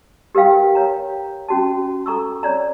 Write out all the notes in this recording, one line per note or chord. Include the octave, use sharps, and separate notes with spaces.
G4 A#4 B4 F5 G5
C#5 A#5
C#4 F#4 A5
A4 A#5 C#6 E6
C#5 D5 A#5